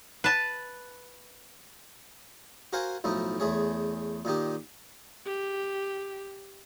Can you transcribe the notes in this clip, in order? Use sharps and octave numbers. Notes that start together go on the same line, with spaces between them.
B4 A5
F#4 A#4 C5 F5 F#5 G#5
B1 A2 F3 D#4
E2 A3 G#4 C#5
A#2 D#3 D#4 G4
G4